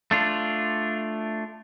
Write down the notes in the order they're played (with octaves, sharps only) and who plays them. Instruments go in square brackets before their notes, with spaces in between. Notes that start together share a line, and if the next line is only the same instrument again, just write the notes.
[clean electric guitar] A3 D4 F4